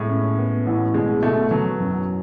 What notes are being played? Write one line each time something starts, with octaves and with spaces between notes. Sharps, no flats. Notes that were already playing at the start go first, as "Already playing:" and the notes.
Already playing: A2 G#3 B3
C#4
B3
A1
B2 G#3
B2 A3
F#3 B3
F#2